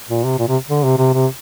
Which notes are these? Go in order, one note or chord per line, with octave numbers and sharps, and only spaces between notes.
A#2
C3
A#2
C3
D3
C3
C3
C3